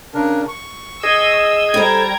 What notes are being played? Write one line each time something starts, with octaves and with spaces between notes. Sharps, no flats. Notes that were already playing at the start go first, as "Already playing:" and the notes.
C#3 D4 A#4
C#6
G#4 D#5 E6
G3 A4 C5 G5 A#5 G#6